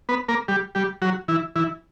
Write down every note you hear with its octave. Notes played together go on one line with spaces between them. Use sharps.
B3 B4
A#3 A#4
G3 G4
G3 G4
F#3 F#4
E3 E4
E3 E4